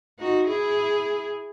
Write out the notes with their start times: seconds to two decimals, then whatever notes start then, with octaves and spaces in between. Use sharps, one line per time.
0.19 D#4 F#4
0.47 E4 G#4